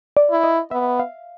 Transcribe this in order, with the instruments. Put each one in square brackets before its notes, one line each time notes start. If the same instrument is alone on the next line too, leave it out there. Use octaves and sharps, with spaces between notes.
[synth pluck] D5
[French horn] E4
[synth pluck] D#5
[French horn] B3 [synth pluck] E5
[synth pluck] F5